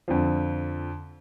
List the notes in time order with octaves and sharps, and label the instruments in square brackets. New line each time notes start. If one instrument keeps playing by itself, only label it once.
[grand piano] F2 D3 F3